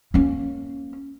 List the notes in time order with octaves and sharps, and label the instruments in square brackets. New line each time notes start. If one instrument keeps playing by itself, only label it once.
[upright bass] A#3 C#4